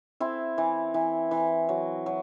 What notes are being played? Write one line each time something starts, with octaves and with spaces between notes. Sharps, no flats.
C4 E4
E3
E3
E3
F#3
F#3